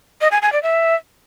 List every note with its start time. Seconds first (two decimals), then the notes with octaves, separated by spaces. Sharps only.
0.21 D#5
0.32 G#5
0.42 G#5
0.52 D5
0.63 E5